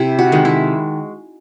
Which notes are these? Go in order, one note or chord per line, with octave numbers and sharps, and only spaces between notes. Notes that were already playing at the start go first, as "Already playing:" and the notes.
Already playing: C3 E4
F#4
D#3 G#3
E4